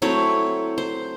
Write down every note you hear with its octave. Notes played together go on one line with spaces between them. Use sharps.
F#3 A3 C4 E4 C#5
C5